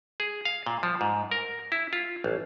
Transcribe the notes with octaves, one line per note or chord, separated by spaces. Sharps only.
G#4
F5
A#2
F3
G#2
A#4
E4
F4
A1